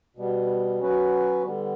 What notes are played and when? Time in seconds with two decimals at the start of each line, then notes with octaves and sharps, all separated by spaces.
0.17 B2 G3 B3
0.80 F#3 C#4 F#4 B4
1.42 D3 G3 B3